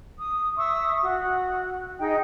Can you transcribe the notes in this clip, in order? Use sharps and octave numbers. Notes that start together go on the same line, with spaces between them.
D#6
E5 C#6 D#6 E6
F#4
D#4 G#4 D#5 G5